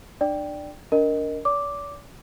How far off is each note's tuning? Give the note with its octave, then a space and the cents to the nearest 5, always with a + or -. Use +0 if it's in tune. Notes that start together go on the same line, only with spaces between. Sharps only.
D4 +30 D5 +0 G5 +0
D4 -35 A#4 +0 D#5 +0
D5 -45 D6 -5